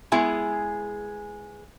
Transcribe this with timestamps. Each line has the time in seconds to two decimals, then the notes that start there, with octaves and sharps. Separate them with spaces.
0.12 G#3 B3 E4 G#4